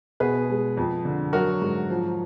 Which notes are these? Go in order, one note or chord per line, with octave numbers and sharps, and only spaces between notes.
B2 G#4 B4
G#3
F2
D3
F#3 F#4 A#4
G#2
F3